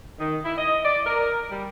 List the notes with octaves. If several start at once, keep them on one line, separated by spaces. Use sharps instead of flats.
D#3
E4
D#5
D5
A#4
G3